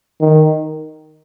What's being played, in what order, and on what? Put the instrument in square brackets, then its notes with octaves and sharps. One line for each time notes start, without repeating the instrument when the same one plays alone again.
[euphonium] D#3